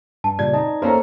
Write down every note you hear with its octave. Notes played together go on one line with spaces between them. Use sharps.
G2 A5
A#2 C#3 G3 D5 G#6
C4 D#4 D#5 A5
A#3 C#4 A4 C5 A#5